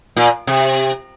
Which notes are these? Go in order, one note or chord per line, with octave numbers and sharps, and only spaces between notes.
A#2
C3